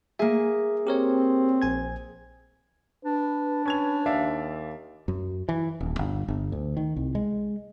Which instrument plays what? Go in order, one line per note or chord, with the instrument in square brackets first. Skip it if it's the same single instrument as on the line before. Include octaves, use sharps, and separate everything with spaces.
[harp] A#3 G#4 [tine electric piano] E5
[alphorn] C4 [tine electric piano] G4 A#4 C#5
[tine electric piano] A#1 G#5 G#6
[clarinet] D4 [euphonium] B4
[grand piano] C#4 G#6 F7 [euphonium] B4
[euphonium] D#2 [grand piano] D5 E5 F5
[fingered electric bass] F#2
E3
D#1
G1
G1
D2
D#3
C2
G#3